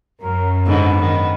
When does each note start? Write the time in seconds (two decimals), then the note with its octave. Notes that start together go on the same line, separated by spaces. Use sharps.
0.22 F#2 A#4
0.66 G#2 D3 B3
1.01 D#3